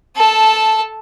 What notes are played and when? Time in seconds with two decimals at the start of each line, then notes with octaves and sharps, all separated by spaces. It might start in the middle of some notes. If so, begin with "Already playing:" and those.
0.16 A4 A5